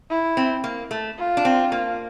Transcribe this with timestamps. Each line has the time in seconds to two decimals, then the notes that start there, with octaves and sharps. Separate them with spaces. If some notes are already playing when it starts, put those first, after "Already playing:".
0.10 E4
0.37 C4
0.64 A#3
0.91 A3
1.18 F4
1.37 D4
1.45 C4
1.72 A#3